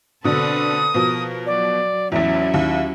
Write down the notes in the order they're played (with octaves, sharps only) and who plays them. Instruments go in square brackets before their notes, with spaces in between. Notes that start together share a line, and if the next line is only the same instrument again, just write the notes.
[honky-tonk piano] B2 D3 [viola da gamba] C4 A4 B4 [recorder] D#6
[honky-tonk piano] B2 F3 [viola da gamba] A#4
[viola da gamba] F#3 [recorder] D5
[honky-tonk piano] A1 E2 [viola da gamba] F#3 C#4 E4 [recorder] E5
[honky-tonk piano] D#2